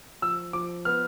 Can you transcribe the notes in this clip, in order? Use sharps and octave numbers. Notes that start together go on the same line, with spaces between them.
F3 E6
F3 D6
B3 F6